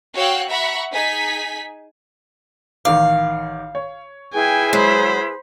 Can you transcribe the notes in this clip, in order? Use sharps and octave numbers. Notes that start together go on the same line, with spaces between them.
F#4 C#5 F5 G5 E6 F#6
E5 F#5 A#5 B5 C#6
D#4 G#4 G#5 B6
A1 D#3 F5 D6
C#5
E4 G#4 B4 G5 G#5
F#3 G#3 C5 B5